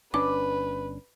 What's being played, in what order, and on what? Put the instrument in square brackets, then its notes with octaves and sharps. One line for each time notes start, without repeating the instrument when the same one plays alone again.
[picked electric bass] G1 C#4 D4 [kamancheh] B4 [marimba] D6